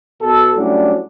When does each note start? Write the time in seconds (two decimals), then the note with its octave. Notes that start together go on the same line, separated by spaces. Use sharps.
0.22 B2 A4
0.55 A2 F#3 G3 C#4 D4